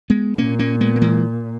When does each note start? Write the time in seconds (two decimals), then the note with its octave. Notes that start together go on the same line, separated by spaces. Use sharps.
0.10 G#3 B3
0.38 A#2 A#3 C#4
0.59 A#3 C#4
0.81 G#3 B3
0.96 A#3
1.02 E3 G#3